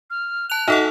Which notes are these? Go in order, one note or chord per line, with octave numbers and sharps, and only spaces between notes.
F6
A5 F#6 F7
D#4 F#4 A4 D#5 E5 F#5